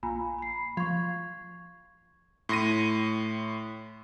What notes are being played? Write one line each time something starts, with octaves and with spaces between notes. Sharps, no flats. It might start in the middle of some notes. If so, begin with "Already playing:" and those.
A#1 G#5 A#5 B5
B5 C7
F3 C#6 G#6
A2 C6 A#6 D#7